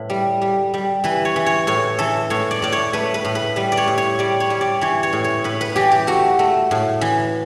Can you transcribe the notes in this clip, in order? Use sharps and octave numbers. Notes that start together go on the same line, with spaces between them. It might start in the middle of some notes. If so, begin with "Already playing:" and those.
Already playing: A2 B4
G3
G3
G3
E3 B4
C#5
E3
C#5
A2 C#5
E3 A4
A2 C#5
D5
A2 D5
C#5
A3 B4
B4
A2
B4
G3 B4
D5
C#5
A2
C#5
G3 D5
C#5
G3
D5
E3 C#5
C#5
A2
C#5
A2 B4
B4
E3 G4
G4
A3 F#4
A3
A2
E3